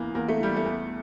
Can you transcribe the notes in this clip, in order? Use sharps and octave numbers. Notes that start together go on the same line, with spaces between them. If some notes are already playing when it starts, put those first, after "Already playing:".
Already playing: E2 E3 A#3
E2 A#3
A3
E3 G3
A3
E2